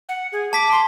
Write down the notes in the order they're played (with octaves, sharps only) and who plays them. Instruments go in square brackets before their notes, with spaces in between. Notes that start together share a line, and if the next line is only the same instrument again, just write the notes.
[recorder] F#5
G#4
[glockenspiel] A5 B6 [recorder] D6
[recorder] C6